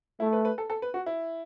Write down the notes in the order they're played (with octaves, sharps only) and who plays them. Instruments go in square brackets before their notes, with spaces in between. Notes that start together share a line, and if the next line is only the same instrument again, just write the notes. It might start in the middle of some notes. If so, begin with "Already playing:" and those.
[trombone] A3 [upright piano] E4
[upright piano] B4
B4
A4
A4
B4
F#4
E4